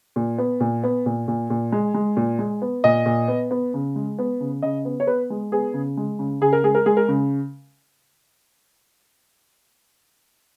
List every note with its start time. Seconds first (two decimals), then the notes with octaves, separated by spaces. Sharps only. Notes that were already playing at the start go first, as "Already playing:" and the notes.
0.16 A#2
0.38 B3
0.60 A#2
0.84 B3
1.06 A#2
1.28 A#2
1.50 A#2
1.72 G#3
1.94 G#3
2.17 A#2
2.39 G#3
2.62 B3
2.84 A#2 D#5
3.06 A#2
3.28 B3
3.51 B3
3.74 C#3
3.96 G#3
4.19 B3
4.40 C#3
4.62 C#3 D#5
4.85 B3
5.00 C#5
5.07 B3 B4
5.30 G#3
5.52 B3 G#4
5.74 C#3
5.97 G#3
6.19 C#3
6.41 C#3 G#4
6.53 A#4
6.64 G#3 G#4
6.75 A#4
6.86 G#3 G#4
6.97 A#4
7.08 C#3